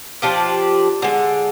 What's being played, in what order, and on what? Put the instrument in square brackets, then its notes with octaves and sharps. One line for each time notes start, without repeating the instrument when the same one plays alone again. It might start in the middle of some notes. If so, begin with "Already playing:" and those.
[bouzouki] F3 D4 F4 G4
D3 G#3